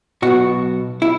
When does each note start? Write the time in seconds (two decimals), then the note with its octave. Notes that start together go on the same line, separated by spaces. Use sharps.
0.22 B1 B2 F#4
1.02 E4